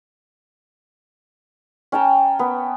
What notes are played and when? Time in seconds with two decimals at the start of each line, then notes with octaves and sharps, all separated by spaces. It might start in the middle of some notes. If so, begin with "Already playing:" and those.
1.92 C#4 G5 A5 A#5
2.39 B3